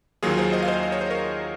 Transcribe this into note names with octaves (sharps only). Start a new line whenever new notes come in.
D#2 D#3 F#3 A#3 F4 G#4
G#4 C5
C5 D#5
F5
C5 D#5
D#5
C#5
C5
A#4 C#5